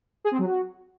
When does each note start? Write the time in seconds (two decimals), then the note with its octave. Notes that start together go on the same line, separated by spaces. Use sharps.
0.24 G#4
0.32 C4
0.39 F#3
0.46 F#4